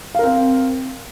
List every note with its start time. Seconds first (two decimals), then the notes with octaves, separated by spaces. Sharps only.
0.15 F5
0.19 A#4
0.23 C4